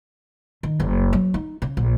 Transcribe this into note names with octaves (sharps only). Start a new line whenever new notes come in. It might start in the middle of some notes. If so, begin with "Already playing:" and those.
D#3
F#1
F#3
D#4
C#3
A#1